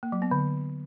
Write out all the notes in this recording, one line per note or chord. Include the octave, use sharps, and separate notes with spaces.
A#3
F#3
B3
D3